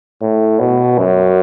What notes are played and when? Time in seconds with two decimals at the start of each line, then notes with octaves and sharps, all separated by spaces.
0.22 A2
0.60 B2
0.98 F#2